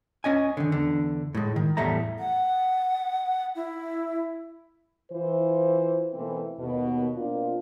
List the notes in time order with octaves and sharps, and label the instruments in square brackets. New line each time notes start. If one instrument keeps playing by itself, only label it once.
[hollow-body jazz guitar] C#4 D#5 G#5
D3 D#3
E2 D3
A2 G#3
D#3
E2 A2 G3 A3 E5 A#5
[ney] F#5
E4
[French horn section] E3 F4 C5
B2 E3 A3 A#3 C4
D#2 B2
B2 A#3 C4 D4 F4